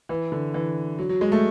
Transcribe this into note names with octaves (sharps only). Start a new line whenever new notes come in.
E3
D3
E3
F#3
F#3
G#3
A3